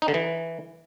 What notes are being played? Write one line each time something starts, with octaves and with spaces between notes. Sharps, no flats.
D#4
D3
E3